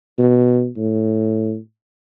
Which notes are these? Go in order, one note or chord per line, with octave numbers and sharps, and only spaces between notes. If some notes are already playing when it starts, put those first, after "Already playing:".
B2
A2